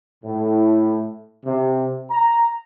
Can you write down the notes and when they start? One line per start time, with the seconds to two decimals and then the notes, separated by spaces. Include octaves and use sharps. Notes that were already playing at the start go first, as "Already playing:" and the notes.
0.23 A2
1.45 C3
2.11 A#5